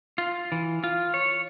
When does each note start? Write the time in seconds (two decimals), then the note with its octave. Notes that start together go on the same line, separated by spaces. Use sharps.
0.18 F4
0.52 E3
0.84 F4
1.14 C#5